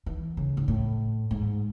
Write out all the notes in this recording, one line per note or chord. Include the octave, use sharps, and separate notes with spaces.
E3
C#3
G#2
A2
G#2